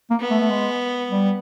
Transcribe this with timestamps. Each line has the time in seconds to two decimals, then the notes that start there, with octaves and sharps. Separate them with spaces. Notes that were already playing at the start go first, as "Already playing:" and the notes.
0.10 A#3
0.20 B3
0.30 A3
0.40 A3
0.50 G#3
1.11 G3